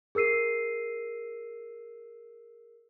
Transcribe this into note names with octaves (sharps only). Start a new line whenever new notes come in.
G#4 A#4 E6 C7 D#7